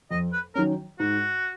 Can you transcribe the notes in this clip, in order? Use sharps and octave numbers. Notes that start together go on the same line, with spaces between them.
F2 D#5
B4
D#3 F#3 C#4 A#4
G#2 F#4